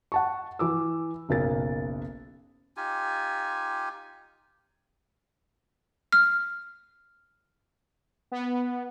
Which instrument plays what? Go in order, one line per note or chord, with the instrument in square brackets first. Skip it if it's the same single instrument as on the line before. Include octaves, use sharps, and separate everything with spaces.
[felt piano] F#5 A5 C#6
E3 D6 E6
F#1 B1 A#4 A6
[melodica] D#4 F4 G4 G#5
[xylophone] F6
[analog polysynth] B3